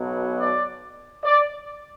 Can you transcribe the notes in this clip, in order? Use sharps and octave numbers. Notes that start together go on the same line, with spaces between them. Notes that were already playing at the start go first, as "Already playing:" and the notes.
Already playing: B1 B2 F#3
D5
D5